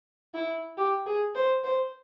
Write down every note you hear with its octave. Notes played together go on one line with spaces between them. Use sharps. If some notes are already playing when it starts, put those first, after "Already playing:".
E4
G4
G#4
C5
C5